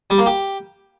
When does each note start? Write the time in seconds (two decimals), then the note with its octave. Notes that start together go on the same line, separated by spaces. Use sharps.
0.10 G3
0.18 A#3
0.26 G4